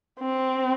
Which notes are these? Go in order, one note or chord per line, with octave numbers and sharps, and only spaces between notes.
C4